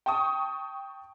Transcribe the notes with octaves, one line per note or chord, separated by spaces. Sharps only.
G5 A5 C#6 D#6